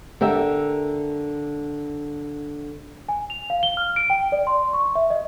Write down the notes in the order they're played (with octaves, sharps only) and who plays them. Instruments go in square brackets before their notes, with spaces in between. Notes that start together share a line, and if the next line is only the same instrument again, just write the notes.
[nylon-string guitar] D3 G4 A#4 E5
[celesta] G#5
F7
F5
G7
F6
D7
G5
D5
C6
C#6
E5
D#5